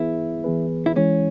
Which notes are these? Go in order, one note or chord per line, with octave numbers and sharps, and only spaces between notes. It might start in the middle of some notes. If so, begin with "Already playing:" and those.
Already playing: E3 B3 E4 G#4 B4
E3 B3 G#4 B4
E4
E3 G#3 C#4 E4